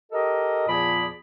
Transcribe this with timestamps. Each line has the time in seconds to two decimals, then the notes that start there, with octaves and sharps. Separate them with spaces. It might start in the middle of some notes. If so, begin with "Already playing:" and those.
0.12 G4 A4 A#4 D#5
0.68 E2 A#2 F3 G#4 D5 B5